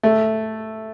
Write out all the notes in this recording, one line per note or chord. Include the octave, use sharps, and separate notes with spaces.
A3